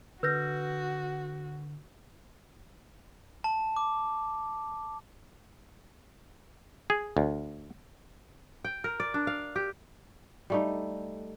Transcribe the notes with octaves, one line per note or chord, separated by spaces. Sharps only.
D3 F#4 B4 E6 G6 A#6
A5
D6
G#4
D2
G5
A#4
D5
D4
F5
G4
G3 A3 D#4